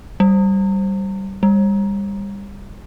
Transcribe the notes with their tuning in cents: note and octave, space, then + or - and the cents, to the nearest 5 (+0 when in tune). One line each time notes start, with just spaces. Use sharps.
G3 -15
G3 +30